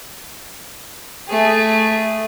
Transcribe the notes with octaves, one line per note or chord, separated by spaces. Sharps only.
A3 G#4